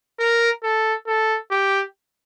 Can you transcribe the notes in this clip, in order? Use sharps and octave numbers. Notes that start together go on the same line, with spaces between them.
A#4
A4
A4
G4